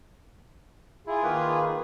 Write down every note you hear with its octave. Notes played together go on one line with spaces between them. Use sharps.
E4 F4 G#4
D#3 A#3 B4